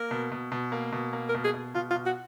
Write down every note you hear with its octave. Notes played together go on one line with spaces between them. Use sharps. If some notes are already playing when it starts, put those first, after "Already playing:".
Already playing: A#3 A#4
B2
B2
B2
A#3
B2
A#3
A#4
B2
G#4
B2
B2 F4
F4
B2
F#4